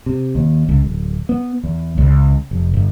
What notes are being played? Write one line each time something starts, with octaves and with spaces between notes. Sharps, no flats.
C3
D#2
C#2
D1
B3
E2
C#2
F1
G1